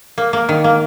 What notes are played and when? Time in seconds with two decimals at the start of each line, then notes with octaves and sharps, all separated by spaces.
0.18 A#3
0.33 A#3
0.49 D#3
0.64 A#3